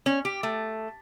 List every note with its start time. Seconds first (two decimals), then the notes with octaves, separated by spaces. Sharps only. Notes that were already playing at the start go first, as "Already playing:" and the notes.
0.06 C#4
0.25 G4
0.43 A3